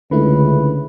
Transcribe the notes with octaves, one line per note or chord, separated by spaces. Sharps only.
C#2 D3 A3 E4 B4